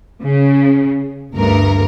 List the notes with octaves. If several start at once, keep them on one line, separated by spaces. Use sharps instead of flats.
C#3
G1 D2 G2 A#4